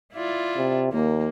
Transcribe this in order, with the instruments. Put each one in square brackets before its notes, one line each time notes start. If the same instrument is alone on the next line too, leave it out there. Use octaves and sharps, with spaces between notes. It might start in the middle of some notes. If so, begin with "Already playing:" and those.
[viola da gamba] E4 F4 D5
[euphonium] C3
[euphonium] D#2 [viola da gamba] A#3